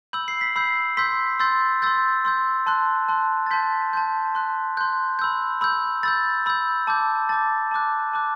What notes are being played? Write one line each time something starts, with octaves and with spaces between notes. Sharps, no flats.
B5 E6 G6 F#7
C7
B6
B5 E6 G6 C7
C6 E6 G6 B6
C6 E6 G6 A6
C6 E6 G6 A6
C6 E6 G6
A5 C6 F#6
A5 C6 F#6
A6
A5 C6 G6 B6
A5 C6 G6
C6 F#6
C6 F#6 G6
B5 E6 G6
B5 E6 G6
B5 E6 G6 A6
B5 E6 G6
A5 D6 G6
A5 D6 G6 A6
A5 D6 F#6
A5 D6 F#6